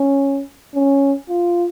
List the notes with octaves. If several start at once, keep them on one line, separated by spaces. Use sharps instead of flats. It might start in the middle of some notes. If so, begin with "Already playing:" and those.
Already playing: C#4
C#4
F4